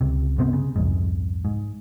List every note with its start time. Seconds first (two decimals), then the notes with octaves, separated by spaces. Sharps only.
0.01 C#2 C3
0.38 G2 C3 B3 C4
0.53 C#3
0.76 C2 F2 G#2
1.45 G#2